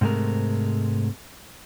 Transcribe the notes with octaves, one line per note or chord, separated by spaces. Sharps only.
G#2 C3 G#3 A3 A#4